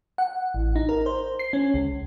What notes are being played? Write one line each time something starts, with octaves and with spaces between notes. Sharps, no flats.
F#5
A1
D#4
A#4
C5
C7
C#4
C#2